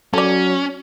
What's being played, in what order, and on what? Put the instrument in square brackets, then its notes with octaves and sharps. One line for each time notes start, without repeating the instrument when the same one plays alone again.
[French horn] F#3 [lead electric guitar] C#4 [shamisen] A4 D5